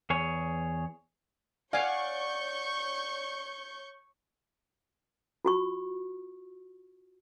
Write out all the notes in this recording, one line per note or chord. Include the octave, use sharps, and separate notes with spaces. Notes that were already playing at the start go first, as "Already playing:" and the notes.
E2 G#4 C#5
C#5 D5 F5 F#5 G#5 C#6 G6
F4 F#4 C#6